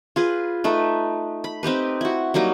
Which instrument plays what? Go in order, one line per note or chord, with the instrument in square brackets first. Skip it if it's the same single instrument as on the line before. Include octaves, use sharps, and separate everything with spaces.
[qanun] F4 G#4 B4
A3 D#4 B4
B5
C4 D#4 G4 B4
E4 F#4
F#3 G3 A#3 D#4